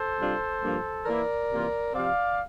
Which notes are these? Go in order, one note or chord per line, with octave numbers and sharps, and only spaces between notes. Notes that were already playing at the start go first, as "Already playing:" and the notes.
Already playing: A4 C5
C3 G3 D4 F4
G2 F3 A#3 F4
E3 A#3 E4 A#4 D5
C3 E3 A#3 F4
C3 F3 C4 D5 F5